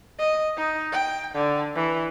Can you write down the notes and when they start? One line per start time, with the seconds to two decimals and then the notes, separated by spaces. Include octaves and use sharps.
0.19 D#5
0.57 D#4
0.92 G5
1.34 D3
1.75 E3